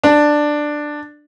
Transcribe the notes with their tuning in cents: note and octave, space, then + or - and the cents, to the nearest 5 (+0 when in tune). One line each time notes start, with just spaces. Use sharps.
D4 +10